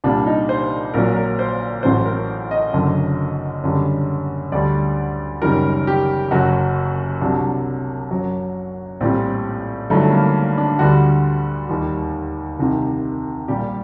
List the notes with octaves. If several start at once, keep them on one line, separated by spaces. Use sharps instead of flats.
C2 A#2 G3 D4
D#4
C5
A#1 A#2 F#3 A#4
A#4
C5
A1 A2 F#3 C5
A#4
D#5
F#1 F#2 D3 F#3
F#1 F#2 D3 G3
D2 D3 G3 D5
F#1 F#2 D#3 G3 A#4
G4
F#1 F#2 F#3 F#4
C2 C3 F#3 D4
F#2 F#3
A#1 A2 G3 C4
G1 G2 D#3 F#3 A3
A#3
D4
D2 D3 G3 F#4
D#2 D#3 G3
C2 C3 D#3
A#1 A#2 G3 G4